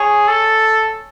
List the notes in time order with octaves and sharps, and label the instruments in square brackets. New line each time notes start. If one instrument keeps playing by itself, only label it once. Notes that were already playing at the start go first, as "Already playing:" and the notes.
Already playing: [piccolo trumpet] G#4 [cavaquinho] C#5 G#5
[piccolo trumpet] A4